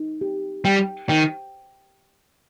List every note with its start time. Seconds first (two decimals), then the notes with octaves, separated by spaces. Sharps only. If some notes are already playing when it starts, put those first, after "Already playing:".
Already playing: D#4
0.21 G4
0.65 G3 G5
1.09 D#3 G5